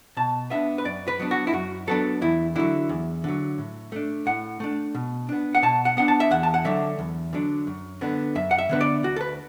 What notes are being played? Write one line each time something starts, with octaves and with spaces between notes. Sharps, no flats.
B2 A5
B3 D4 E5
B4
F#2 D5
B4
F#3 B3 D4
F#4
E4
F#2 F#4
F#3 B3 D4 A4
E2 E4
D3 F#3 E4
E2
D3 F#3
A2
A3 D4
A2 F#5
A3 D4
B2
B3 D4
F#5
B2 A5
F#5
B3 D4 F#5
A5
E5
E2 F#5
A5
F#5
D3 F#3 D4 E5
E2
D3 F#3 D4
F#2
D3 B3 D4
F#2 E5
F#5
E5
D3 B3 D4 B4
D5
D2 F#4
A4
B4